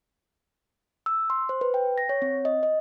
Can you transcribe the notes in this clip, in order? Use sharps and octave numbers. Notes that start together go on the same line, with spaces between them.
E6
C6
C5
B4
G5
A#6
C#5
C4
D#5
D#5